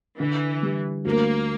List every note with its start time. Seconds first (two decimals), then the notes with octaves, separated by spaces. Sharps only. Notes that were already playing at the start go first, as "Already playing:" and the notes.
0.19 D3 E3
0.63 G3
1.05 D2 A#3